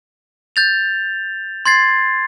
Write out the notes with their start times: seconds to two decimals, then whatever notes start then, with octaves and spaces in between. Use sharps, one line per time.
0.56 G6 A6 F7
1.66 C6 G#6 A6 C7